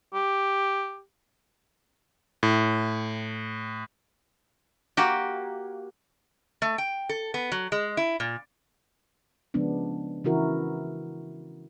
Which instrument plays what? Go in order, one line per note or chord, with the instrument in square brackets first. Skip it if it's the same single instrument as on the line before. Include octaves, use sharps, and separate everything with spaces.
[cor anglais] G4
[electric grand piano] A2
[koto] A#3 F#4 G4
[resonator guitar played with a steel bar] A3
G5
A4
B3
F#3
G#3
E4
A#2
[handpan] C#3 F3 G#3 B3 D4
C#3 E3 E4 F#4 A#4